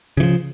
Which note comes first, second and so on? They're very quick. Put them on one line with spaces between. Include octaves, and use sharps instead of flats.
C#3 E3 F3